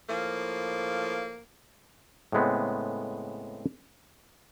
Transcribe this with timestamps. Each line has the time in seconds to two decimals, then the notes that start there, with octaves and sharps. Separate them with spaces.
0.09 A2 F3 A#3
2.32 A2 C#3 G#3 B3 C4